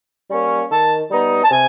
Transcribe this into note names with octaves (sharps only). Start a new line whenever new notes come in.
G3 A#3 C#4
D#3 A5
G3 B3 D#4
A5
C3 G#5